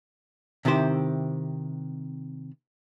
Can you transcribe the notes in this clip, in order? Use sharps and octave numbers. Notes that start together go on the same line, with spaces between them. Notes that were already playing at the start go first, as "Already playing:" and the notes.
C3 D#3 E4 G4 C5